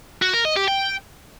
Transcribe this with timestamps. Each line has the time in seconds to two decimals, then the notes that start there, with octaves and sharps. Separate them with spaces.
0.22 F#4
0.34 A#4
0.45 D#5
0.57 G4
0.68 G5